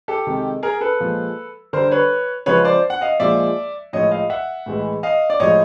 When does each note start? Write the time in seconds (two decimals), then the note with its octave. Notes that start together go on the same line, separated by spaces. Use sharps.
0.08 G4 A4
0.27 C3 D#3 G#3
0.63 G#4 A#4
0.81 A4 B4
1.00 A#2 F3 G#3
1.73 D3 G3 A#4 C5
1.91 B4 C#5
2.46 C#3 F3 G#3 B4 C#5
2.65 C5 D5
2.90 F#5
3.01 D#5 F5
3.20 A#2 F3 G#3 D5 E5
3.93 A2 F3 G#3 C#5 D#5
4.11 D#5 F5
4.30 E5 F#5
4.66 A2 E3 G#3
5.03 D#5 F5
5.30 D5
5.40 A2 F3 G#3 C#5 D#5